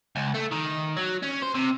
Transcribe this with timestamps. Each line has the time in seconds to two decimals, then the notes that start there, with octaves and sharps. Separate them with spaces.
0.16 C#2
0.35 A3
0.52 D#3
0.97 F#3
1.23 C#4
1.43 C5
1.55 C3